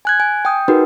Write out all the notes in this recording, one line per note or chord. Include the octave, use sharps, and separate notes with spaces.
G#5 F#6 G#6
G#5
G5 D#6 G6
D#4 F#4 G#4 A#4 B4